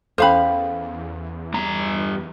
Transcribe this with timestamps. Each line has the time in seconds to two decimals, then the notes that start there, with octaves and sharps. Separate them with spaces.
0.18 E2 C#4 A4 C5 F5 B5
1.54 G2 A#5